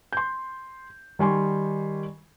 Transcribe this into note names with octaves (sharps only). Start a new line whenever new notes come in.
C6 G6
D#3 G3 G#5 C6 C#6